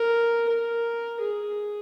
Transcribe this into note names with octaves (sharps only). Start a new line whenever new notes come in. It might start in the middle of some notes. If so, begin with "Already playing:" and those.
Already playing: A#4
A#4
G#4